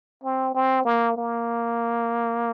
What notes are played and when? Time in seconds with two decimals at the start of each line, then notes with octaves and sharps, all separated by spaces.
0.24 C4
0.55 C4
0.85 A#3
1.17 A#3